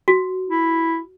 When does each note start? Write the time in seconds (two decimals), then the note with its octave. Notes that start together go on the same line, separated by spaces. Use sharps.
0.08 F#4
0.49 E4